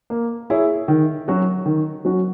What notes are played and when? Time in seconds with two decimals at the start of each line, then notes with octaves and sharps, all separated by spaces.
0.10 A#3
0.50 E4 G#4 C#5
0.88 D#3
1.28 F#3 C#4 F#4
1.66 D#3
2.05 F#3 C#4 F#4